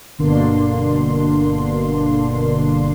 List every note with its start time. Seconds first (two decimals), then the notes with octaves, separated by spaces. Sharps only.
0.18 G1 B2 D3 A#3 D4 C6